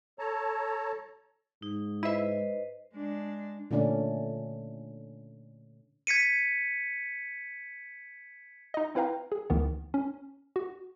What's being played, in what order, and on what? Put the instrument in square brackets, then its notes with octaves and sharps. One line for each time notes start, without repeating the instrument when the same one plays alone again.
[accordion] A4 C#5 A5 A#5
[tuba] G#2 [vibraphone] D#4
[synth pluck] E4 E5 [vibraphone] B4 C5 D#5
[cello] G#3 D4
[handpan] A#2 D3 A3 C#4 D4 D5
[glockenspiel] G#6 B6 C#7 D#7
[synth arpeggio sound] D#4 D#5
C4 E4 B4 F5 G5 A#5
G#4
D2 D#3 E3 B3
C#4
F#4